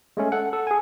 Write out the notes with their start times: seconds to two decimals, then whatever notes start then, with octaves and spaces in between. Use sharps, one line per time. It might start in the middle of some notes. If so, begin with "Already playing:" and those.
0.17 G#3 A3 C#4
0.32 A4 F#5
0.53 A4
0.67 G#4 G#5